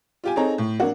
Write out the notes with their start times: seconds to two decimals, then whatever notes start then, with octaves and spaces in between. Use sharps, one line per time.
0.24 F4 G4 G#5
0.36 C4 D#4 G#4 A4 C#5 A#5
0.58 A2
0.80 F#3 A#3 D4 F#4